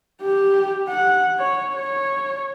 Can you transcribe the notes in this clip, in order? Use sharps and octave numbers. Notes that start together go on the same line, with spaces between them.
G4
F#5
C#5
C#5